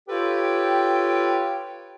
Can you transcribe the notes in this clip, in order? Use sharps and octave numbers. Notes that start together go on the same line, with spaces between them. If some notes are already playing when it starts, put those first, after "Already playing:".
F4 G4 A4 B4 C#5 G5